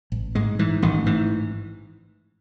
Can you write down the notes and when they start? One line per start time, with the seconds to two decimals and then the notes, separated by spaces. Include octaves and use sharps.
0.12 A1
0.35 G#2 G#3
0.59 G#2 E3
0.82 A1 D#3
1.06 G#2 E3